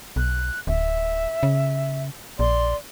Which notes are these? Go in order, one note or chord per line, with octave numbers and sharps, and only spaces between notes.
B1 F#6
D1 E5
C#3
A#1 D5 C6